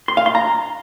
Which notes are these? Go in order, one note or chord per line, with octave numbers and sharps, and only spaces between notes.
C6
F5
C6
A#5